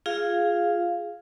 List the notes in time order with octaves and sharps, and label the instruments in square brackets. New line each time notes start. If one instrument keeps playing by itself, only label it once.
[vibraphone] F4 G#4 F5